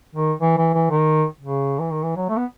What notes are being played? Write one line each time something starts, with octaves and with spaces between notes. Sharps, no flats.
D#3
E3
E3
E3
D#3
C#3
E3
D#3
E3
F#3
A3
B3